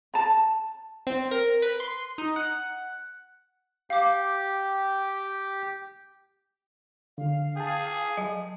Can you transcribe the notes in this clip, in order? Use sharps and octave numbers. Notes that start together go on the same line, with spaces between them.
A5 A#5
C4
A#4
B4
C6
D#4
F#5
G4 F5 G5 D6
D3 F5
G#4 G5 A5
F#3